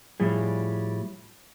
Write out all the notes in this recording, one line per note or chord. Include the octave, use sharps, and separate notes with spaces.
A2 F3 G3 G#4